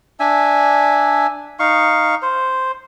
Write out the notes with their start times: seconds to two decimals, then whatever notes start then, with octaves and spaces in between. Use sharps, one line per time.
0.20 D4 E5 G#5
1.59 D#4 F5 C#6
2.22 C5